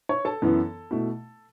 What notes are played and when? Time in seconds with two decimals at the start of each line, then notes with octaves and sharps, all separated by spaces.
0.09 C#5 C#6
0.25 A4 A5
0.42 F#2 E3 B3 E4
0.91 B2 A3 E4